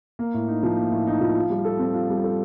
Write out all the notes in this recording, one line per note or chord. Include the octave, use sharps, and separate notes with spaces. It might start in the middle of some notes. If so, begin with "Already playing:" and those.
A#3
A2
D#4
F3
A#3
A2
D#4
F3
F4
G3
A4
C4
F4
G3
A4